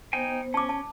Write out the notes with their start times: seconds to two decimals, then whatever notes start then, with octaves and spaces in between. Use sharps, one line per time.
0.13 B3 D#4 C5 G5 G#5
0.54 C#4 A5 D6
0.69 A5